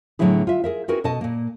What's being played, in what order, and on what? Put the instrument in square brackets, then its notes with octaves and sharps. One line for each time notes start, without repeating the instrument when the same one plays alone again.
[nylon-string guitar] A2 D3 F#3 B3 E4 G#4
F4 E5
G#4 A#4 E5
C4 E4 F#4 G#4 A#4 B4
B2 A4 D#5 A5
A#2 A#3